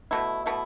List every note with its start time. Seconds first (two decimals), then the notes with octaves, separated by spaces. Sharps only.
0.11 B2 A3 E4
0.46 B2 A3 E4